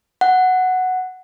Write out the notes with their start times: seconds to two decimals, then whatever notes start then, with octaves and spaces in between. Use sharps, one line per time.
0.21 F#5